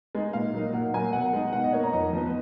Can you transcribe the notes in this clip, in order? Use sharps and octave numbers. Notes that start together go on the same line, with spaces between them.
G#3 D#4
A#2 F5
F#3 A#3 D#4
A#2 F#5
F#3 A#3 G#5
B2 F#5
G#3 D#4
B2 F#5
D#5
A#3 D#4 C#5
A#5
F2 D#5
F3 B3 D#4
B4